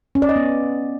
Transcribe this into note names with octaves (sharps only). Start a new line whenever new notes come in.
C#4
D5
D#5
B3